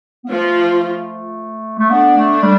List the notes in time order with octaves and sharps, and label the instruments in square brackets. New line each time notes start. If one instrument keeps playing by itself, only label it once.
[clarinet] B3
[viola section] F3 F4 [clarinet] A3
[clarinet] A3
[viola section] D3 D4 [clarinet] B3
[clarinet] A3
G3